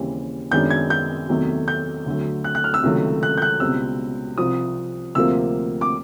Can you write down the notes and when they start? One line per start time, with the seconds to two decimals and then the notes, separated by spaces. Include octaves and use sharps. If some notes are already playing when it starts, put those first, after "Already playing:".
Already playing: D#2 C#3 E3 G3 C4
0.51 F#2 D#3 G#3 B3 D4 G6
0.70 G#6
0.90 G6
1.29 E2 C3 D#3 F#3 A3
1.68 G6
2.06 D2 D3 F#3 A3
2.44 F#6
2.55 F#6
2.64 F6
2.74 E6
2.83 C#2 C3 D#3 F#3 A3
3.23 F#6
3.38 G6
3.42 F#6
3.60 C#2 B2 G3 C4 E6
4.38 C2 C3 F3 D#6
5.15 D2 C3 F3 A#3 E6
5.81 D6